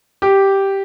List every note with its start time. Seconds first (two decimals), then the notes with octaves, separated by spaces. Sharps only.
0.22 G4